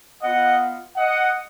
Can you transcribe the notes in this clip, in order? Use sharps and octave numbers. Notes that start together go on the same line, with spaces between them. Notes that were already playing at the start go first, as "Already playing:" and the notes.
B3 F4 D#5 F#5
D#5 F#5